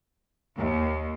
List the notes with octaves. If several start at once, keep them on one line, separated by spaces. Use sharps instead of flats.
D#2